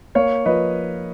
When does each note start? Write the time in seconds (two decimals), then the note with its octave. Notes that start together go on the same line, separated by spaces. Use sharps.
0.15 A#3 C#5 F5
0.45 F3 B4 D#5